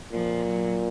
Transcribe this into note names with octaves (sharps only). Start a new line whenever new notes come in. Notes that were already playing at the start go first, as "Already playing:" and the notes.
A#2 F3
F#3